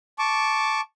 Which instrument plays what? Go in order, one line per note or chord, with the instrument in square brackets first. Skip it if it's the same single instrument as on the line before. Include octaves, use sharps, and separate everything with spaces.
[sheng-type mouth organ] A5 C#6 D6